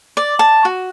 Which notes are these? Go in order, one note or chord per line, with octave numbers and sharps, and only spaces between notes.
D5
A5
F#4